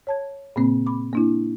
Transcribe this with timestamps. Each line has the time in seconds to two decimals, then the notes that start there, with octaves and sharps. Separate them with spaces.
0.07 C#5 A5 G#6
0.56 A#2 C#3 A#3 C4
0.87 B5 D6
1.13 A#3 D4 E4